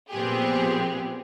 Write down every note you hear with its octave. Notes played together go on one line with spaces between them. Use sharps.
A#2 F3 B3 C4 G4 G#4